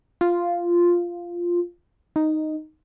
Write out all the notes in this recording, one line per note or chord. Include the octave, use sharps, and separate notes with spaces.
F4
D#4